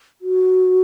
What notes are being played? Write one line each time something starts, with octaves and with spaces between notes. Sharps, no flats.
F#4